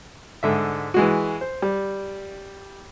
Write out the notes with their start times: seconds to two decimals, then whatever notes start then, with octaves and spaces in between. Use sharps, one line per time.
0.43 G#2 D3 E5
0.94 E3 G#3 F#4
1.41 C5
1.62 G3